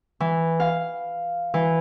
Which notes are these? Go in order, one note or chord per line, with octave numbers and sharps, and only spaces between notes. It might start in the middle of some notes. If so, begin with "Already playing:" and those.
E3
F5
E3